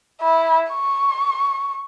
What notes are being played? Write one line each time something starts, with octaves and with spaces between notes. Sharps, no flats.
E4
C#6